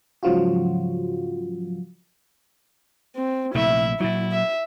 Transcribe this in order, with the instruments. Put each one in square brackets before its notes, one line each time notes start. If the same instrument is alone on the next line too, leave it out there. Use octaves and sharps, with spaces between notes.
[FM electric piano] G#2 C#3 F3 F#3 F4 F#4
[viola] C4
[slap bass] A#1 C3 A3 [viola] E4 E5
[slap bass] A#2 F#3 [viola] E4
[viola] E5